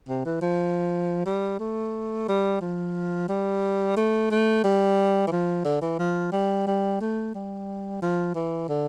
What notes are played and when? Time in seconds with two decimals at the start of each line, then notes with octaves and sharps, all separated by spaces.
0.09 C3
0.25 E3
0.41 F3
1.26 G3
1.60 A3
2.28 G3
2.61 F3
3.29 G3
3.96 A3
4.31 A3
4.64 G3
5.27 E3
5.32 F3
5.65 D3
5.82 E3
5.99 F3
6.32 G3
6.67 G3
7.01 A3
7.34 G3
8.02 F3
8.35 E3
8.69 D3